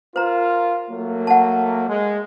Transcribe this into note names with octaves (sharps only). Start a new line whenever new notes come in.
F4 A#4 C5 A#5
F#3 A3 A#3
F#5 A5
G#3